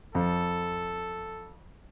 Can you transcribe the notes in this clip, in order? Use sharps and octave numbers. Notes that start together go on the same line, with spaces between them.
F2 A4